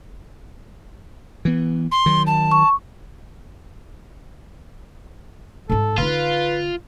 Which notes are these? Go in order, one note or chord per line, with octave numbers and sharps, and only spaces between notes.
E3 B3
C6
D#3 F#3
A5
C#6
G#2 D#4 A4
D3 D#4 F4 B4